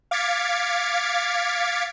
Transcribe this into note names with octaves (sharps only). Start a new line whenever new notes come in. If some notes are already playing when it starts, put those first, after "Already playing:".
F5 D6 G#6 A6 B6 C#7